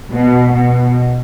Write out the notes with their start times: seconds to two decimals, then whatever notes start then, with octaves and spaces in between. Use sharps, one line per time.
0.11 B2
0.52 B2